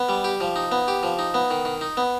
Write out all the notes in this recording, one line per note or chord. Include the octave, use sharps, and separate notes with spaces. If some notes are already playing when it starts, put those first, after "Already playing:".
Already playing: B3
G3
G4
F3
D#4
B3
G4
F3
D#4
B3
D#3
D#3
D#4
B3